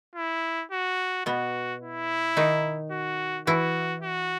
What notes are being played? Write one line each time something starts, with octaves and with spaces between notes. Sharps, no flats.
E4
F#4
B2 B3 F#4
E4
D#3 D#4
F#4
E3 E4 F#4
F#4